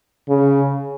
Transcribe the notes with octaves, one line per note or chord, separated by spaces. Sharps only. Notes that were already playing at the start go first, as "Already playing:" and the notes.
C#3